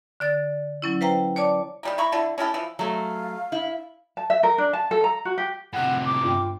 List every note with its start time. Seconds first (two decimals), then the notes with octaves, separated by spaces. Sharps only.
0.20 D3 D5 A6
0.82 F#3 C#4 E4
1.01 B4 C5 F5 G5 A#5
1.36 C#5 D5 A5 D6
1.83 D#3 G3 A#3
1.98 E4 A#5 B5 C#6
2.12 D3 E4 A4
2.38 C#4 E4 G4 A4
2.54 E3 F3
2.79 F#3 A3 F5
3.52 E4
4.17 A5
4.30 E5
4.43 A#4
4.58 D4
4.73 A5
4.91 A4
5.04 A#5
5.25 F#4
5.38 G4
5.73 A2 C3 F#5
6.05 D6
6.22 G1 F4 G5